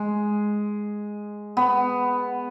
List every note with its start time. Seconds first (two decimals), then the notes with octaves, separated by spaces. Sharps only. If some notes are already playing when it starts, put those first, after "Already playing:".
Already playing: G#3
1.57 B3